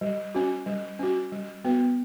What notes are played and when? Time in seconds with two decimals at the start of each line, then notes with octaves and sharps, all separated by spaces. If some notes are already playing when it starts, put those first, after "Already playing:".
0.01 G3
0.35 C#4 F#4
0.66 G3
0.99 C#4 F#4
1.32 G3
1.64 B3 F#4 B4